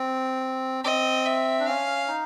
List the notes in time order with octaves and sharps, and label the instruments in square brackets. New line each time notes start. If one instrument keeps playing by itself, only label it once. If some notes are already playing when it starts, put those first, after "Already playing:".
Already playing: [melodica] C4
[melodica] C4 [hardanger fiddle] D#5
[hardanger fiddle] E5
[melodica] D4
[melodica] C#4 [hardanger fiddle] F5
[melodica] D#4